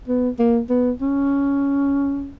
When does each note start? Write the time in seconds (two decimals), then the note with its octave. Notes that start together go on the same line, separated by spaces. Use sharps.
0.08 B3
0.39 A#3
0.70 B3
1.01 C#4